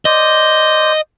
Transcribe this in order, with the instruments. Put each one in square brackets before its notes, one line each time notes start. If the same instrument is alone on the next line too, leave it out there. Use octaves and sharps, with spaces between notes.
[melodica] C5 D5 [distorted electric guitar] D#5